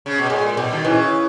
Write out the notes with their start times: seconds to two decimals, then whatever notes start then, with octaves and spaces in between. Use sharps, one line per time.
0.06 C#3
0.18 B2
0.29 A#2 G#3
0.57 B2 G3
0.72 D#3
0.85 C#3 E3